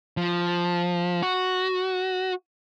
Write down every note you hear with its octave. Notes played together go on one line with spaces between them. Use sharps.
F3
F#4